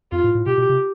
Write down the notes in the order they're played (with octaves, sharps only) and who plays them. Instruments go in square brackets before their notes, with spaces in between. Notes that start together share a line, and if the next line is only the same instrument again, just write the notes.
[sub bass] F2 [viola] F4
[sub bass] A2
A2
[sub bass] B2 [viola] G4
[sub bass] B2
C3